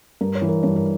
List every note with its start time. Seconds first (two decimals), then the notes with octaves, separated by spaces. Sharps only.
0.21 G2 A#4
0.35 C#5
0.42 E3
0.49 A#4
0.63 G2 C#5
0.76 A#4